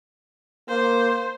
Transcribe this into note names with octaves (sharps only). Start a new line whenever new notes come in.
A#3 C5